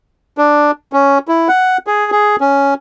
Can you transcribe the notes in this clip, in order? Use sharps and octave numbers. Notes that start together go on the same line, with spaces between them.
D4
C#4
E4
F#5
G#4
G#4
C#4